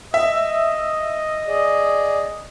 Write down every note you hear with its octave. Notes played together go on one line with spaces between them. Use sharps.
D#5 E5
G#4 D5